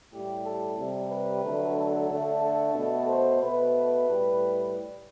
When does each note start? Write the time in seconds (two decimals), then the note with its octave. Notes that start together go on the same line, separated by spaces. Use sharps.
0.12 A2 G3 G4
0.46 A4
0.78 C3 G3
1.11 B4
1.44 D3 F#3 A3
1.77 A4
2.10 D3 A3
2.43 A4
2.75 B2 A3
3.09 C5
3.41 B2 A3 B4
4.08 A2 G3